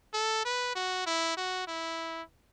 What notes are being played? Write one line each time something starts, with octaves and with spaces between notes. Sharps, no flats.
A4
B4
F#4
E4
F#4
E4